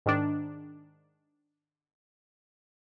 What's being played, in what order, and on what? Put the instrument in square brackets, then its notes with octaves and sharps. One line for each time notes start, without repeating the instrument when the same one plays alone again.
[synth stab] G#2 D#3 D4